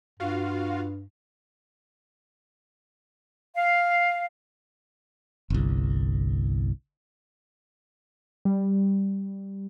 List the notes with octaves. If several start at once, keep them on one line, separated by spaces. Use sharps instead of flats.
G2 F4 F#4 F5
F5
G1 C2
G3